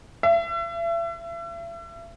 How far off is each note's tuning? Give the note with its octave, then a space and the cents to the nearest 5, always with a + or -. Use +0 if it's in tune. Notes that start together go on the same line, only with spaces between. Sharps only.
E5 +40